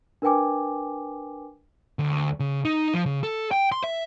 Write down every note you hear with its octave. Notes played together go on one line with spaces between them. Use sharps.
D4 A#4 B4 G5 G#5 D6
D2
C#3
D#4
F3
C#3
A4
G5
C6
E5